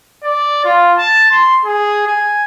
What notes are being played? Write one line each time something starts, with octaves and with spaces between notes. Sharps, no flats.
D5
F4
A5
C6
G#4
G#5